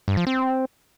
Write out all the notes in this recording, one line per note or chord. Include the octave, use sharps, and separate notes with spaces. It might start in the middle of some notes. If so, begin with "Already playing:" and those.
G2
F3
C4